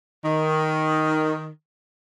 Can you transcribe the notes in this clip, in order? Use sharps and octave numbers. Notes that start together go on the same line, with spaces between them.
D#3